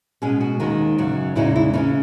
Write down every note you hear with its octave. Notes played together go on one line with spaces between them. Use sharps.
B2 G#3 C#4 G#4
F#4
D#2 D#3 G#3 D#4
F#2 C#3 F#3
E2 C#3 G#3 D#4 E4
E4
C#3 G#3 C#4 D#4